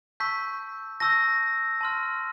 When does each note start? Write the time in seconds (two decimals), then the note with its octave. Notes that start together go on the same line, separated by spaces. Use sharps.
0.20 A5 C#6 E6 G6 B6
1.00 A5 C#6 E6 G6 A#6
1.81 A5 C6 F6